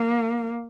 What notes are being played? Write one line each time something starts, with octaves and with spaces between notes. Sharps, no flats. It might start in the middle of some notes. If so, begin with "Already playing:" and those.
Already playing: A#3